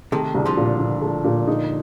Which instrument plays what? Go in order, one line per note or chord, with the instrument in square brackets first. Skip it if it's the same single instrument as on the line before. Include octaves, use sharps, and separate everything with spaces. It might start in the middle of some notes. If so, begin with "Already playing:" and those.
[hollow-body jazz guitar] C3 D#3 [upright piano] A3
[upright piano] C2
[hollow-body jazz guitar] D3 F3
[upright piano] A#2
A#2
A3
A#2
D#4